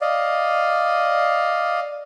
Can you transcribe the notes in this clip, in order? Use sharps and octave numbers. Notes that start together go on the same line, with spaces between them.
D5 D#5 F5